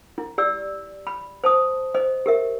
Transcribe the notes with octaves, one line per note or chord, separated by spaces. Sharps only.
E4
G4 D5 E6
B5
C5 A5 D#6
C5 D#5
G4 A#4 E5